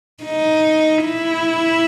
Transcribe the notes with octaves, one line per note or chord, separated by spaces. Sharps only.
D#4
E4